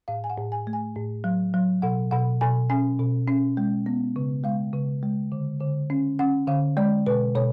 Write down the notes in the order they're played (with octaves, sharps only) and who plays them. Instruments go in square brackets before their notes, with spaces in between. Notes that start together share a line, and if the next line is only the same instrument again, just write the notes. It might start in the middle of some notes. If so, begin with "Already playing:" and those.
[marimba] A2 F5
G#5
F#5
A2
G#5
A3
G#5
A2
F#3
F#3
B2 F#5
B2 F#5
B2 G#5
C#4 G#5
B2
C#4
G#3
B3
C#3
G#3 F5
C#3
G#3
D3
D3
C#4
C#4 F#5
D3 F5
G#3 D5
B2 B4
B2 C#5